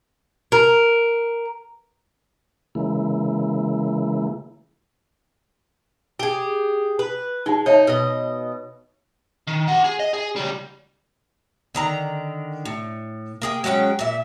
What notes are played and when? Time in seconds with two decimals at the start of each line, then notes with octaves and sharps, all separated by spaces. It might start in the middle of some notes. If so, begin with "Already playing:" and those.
0.52 A#4
2.75 C#3 E3 G#3 A#3 E4
6.19 G4 G#4
6.99 B4
7.46 G#3 D#4 A5
7.66 D#4 C#5 E5 A5
7.87 B2 D#5
9.47 D#3
9.67 G4 F#5
9.84 G#4
9.99 D#5
10.13 G#4
10.36 C#3 G3
11.75 D3 D#3 A#5
12.65 A2
13.42 A#3 G#4 G5
13.64 F#3 G#3 C#4 G5
13.99 A#2 E5